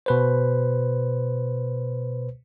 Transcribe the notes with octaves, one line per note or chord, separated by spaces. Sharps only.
B2 B4 C5